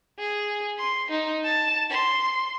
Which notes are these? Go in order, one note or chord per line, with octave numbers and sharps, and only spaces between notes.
G#4
C6
D#4
A5
C6